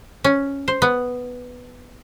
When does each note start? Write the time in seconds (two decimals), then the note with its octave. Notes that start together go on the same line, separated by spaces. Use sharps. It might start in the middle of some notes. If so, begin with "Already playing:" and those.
0.24 C#4
0.68 C5
0.82 B3